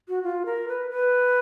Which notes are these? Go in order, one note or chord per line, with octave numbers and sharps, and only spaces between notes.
F#4
F4
A#4
B4
B4